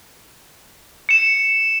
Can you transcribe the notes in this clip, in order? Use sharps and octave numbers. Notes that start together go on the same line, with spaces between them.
C#7 E7